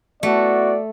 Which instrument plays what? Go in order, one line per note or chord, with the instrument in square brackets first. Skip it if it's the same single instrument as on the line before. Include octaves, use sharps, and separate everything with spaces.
[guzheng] A3 [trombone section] B3 E4 F#4 [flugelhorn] D5